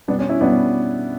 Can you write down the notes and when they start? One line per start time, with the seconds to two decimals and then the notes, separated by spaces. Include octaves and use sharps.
0.08 G3 B3 D4
0.12 B2
0.19 C#4
0.29 C#4 E4
0.41 B2 G3 B3 D4